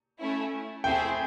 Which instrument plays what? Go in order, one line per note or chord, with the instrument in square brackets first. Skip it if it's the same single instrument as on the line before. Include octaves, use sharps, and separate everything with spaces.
[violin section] A3 C#4 E4
[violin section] A3 C4 E4 G#4 [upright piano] G5